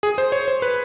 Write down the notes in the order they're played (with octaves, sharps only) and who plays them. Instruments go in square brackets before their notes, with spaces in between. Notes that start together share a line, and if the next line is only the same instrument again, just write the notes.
[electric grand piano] G#4
C5
C#5
C5
B4